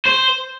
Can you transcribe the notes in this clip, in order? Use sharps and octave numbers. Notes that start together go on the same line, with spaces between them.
C5